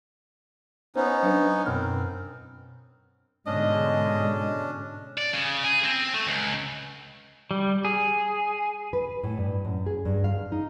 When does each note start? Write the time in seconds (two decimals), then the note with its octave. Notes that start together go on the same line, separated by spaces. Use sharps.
0.96 B3 C#4 D#4 C5 C#5
1.23 F#3 D4 B4
1.66 F#2 B2 C4 F6
3.46 G#2 B2 D3 G#3 C#4 D4 D#5
5.18 D5
5.34 C#3
5.64 G#4
5.84 C4
6.14 A3
6.26 C#2
7.51 G3
7.85 G#4
8.93 B4
9.24 A2
9.38 G2
9.65 F#2
9.86 G#4
10.05 G2
10.24 F5
10.52 D#4